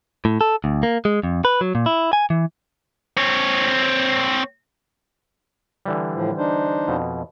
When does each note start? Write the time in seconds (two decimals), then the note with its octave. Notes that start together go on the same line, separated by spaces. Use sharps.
0.25 A2
0.41 A4
0.64 D2
0.83 A#3
1.05 G#3
1.23 F2
1.45 B4
1.61 F#3
1.75 A#2
1.86 E4
2.13 G#5
2.30 E3
3.17 C4 C#5
5.85 D3 E3 G3
6.14 A2 F3
6.37 D4 D#4 C5
6.88 F2 B2